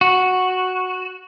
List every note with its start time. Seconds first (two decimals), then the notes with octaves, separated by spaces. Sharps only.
0.01 F#4